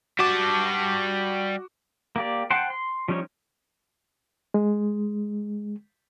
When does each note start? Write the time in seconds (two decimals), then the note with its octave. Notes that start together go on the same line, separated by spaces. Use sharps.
0.19 G3 F#4 A5 D6
2.16 A#3 G4 D5
2.50 C5 F#5 G5 A5 C6
2.70 C6
3.08 F3 G3 C#4 D#4 C#5
4.54 G#3